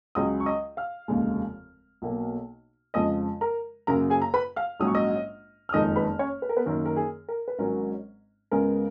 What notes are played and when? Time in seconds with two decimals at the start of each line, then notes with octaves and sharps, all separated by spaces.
0.15 C#2 C#3 F#3 C#4 D#5 D#6
0.40 C#6
0.46 D#5 D#6
0.77 F5 F6
1.08 F1 D#2 C#3 G#3
2.02 B1 B2 A#3
2.94 F2 C#3 F3 G#3 D#5 D#6
3.41 A#4 A#5
3.87 F#2 C#3 F#3 A#3 A#4 A#5
4.10 G#4 G#5
4.22 A#5
4.34 B4 B5
4.56 F5 F6
4.80 A#1 G#2 F#3 C#4 D#6
4.87 C#6
4.95 D#5 D#6
5.69 F6
5.73 F#1 F2 D#3 G#3 D#4 D#5 D#6
5.96 B4 B5
6.19 C#4 C#5
6.42 B4
6.49 A#4
6.57 B3 B4
6.66 F#2 D#3 A#3 A#4
6.85 A#4
6.96 G#4
7.29 A#4
7.48 B4
7.59 G#1 G#2 F#3 C#4 A#4
8.51 C#2 C#3 G#3 B3 A#4